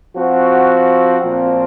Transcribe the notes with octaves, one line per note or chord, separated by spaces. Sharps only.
F3 C4 F#4
A#2 F3 C4